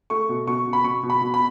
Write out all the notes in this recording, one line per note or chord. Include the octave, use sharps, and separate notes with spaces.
A3 C#6
B2
B2 C#6
B2
B5
B2 C#6
B2
B5
B2
B5